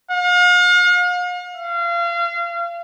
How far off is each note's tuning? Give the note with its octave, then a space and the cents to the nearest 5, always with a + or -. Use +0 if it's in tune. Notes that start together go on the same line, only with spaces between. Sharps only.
F5 +40
F5 -30